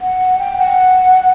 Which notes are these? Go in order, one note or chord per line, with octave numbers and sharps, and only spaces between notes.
F#5
G5
F#5